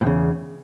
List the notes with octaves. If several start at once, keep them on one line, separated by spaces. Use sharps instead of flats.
E2 A2 C#3